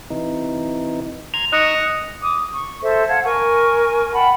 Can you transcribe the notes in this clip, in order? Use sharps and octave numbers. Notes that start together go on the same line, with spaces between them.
C3 E3 D#4
A#5 C6 G#6 F7
D#4 D#5 C#6 E6 F#6 C#7 F7
D6 D#6
C#6
A4 C5 E5
F5 F#5 A5 G#6
A#4 G#5 C#6
F#5 G5 A5 B5